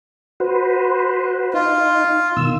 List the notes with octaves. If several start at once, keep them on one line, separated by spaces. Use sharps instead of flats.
F#4 B4 C5
D#4 F4
B2 D#3 E6